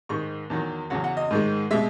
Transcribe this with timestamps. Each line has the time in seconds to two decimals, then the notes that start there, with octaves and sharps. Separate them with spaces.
0.09 G#2 D#3 G#3 C#6
0.50 E2 D#3 F#3
0.90 E2 C#3 F#3 F#5
1.04 F#5
1.17 D#5
1.31 G#2 D#3 G#3
1.71 B2 G#3 E5